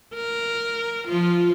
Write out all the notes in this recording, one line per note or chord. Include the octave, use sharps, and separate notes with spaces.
A#4
F3 F4